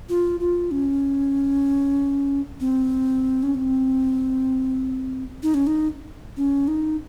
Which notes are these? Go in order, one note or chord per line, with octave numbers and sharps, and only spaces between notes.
F4
F4
C#4
C4
C#4
C4
D#4
C#4
D#4
C#4
D#4